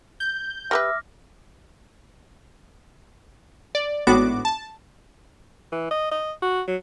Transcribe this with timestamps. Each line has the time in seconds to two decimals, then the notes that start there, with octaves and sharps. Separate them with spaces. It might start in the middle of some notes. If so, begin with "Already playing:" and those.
0.20 G6
0.71 G3 A#4 B4 E5 D6 F6 A#6
3.75 D5
4.07 G#1 A2 B3 D4 F#4 D6
4.45 A5
5.72 E3
5.91 D#5
6.12 D#5
6.42 F#4
6.68 F#3